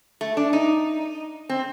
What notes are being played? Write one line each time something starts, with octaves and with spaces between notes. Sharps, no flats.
A3
D4
D#4
C4